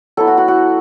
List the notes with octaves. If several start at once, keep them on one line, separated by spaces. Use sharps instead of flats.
F#3 B3 E4 A4
F#4
F#4
F#4